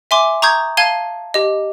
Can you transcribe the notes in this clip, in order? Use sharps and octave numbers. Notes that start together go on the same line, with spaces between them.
E5 G#5 C6 D6
A#5 C#6 D#6 G6 G#6
F5 A5 G#6 D#7 G7
G4 D#5